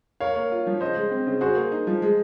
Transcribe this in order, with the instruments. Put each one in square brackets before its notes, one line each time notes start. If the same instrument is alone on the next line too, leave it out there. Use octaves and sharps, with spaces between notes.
[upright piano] A#4 [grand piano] C#5 F5
[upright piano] A#3
F4
F3
[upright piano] C#3 [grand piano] C5 D#5
[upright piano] G#3
C4
C#3
[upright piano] F#4 [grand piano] G#4 C5
[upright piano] A#3
D#4
F3
G#3